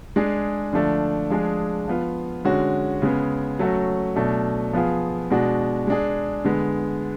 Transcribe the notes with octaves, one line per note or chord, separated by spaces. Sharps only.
G#3 D4 G#4
D3 F3 A3 D4
F3 G#3 D4 G#4
F3 B3 F4
D3 G#3 C#4 F#4
C#3 G#3 B3
F#3 A3 C#4 F#4
B2 F#3 A3 D4
F3 B3 F4 G#4
B2 G#3 D4 F#4
G#3 D4 G#4
D3 G#3 B3